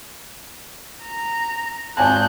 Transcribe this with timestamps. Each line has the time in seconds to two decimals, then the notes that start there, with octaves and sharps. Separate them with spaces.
1.04 A#5
1.97 G#1 G#5 A5 F#6 G6